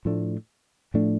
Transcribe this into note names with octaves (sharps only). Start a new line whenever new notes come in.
A2 F3 A3 D4
A2 F3 A3 D4